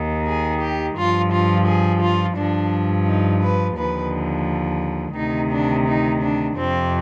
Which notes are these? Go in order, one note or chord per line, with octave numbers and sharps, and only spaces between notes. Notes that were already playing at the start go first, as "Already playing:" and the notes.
Already playing: D#2 D#3
G#4
G4
G2 F3 F4
F4
G#4
F4
G2 F3 D4
D#4
B4
D#2 D3 F3 B4
D2 C3 D#3 D#4
D4
D#4
D4
F2 C3 F3 C4